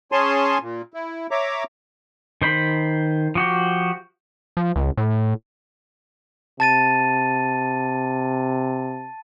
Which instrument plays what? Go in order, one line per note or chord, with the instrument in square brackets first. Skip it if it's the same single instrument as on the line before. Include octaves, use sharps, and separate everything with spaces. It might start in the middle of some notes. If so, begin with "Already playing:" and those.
[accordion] C#4 G#4 C#5 G#5 A5 C6
A#2
E4
C#5 E5 A#5 D6
[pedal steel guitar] D#3 C5 B5
F3 F#4 G4
[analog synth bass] F3
C#2
A2
[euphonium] C3 [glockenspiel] A5 A6 D#7